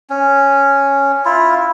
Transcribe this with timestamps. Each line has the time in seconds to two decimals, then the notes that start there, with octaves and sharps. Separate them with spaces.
0.10 C#4
1.25 E4 F4